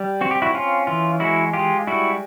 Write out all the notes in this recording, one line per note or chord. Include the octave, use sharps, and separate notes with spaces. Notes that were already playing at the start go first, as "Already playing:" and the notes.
Already playing: G3
C4 F#4
G4
E4 F#4
C#4 F4
E3 F4
G#3 E4 F#4
G#3 F4 G4
G3 E4 F#4